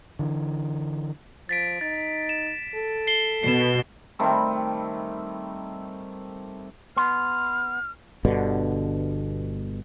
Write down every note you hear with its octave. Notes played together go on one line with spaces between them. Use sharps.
D3 E3
F3 A6 B6 D7
D#4 A6
E7
A4
C7 G7
B2 C7 E7
D#3 G3 A3 C4
B3 C6 F6
G1 G2 B2 D3